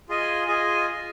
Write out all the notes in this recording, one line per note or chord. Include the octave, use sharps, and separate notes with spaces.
F4 G#4 D#5 G#5
F4 G#4 D#5 G#5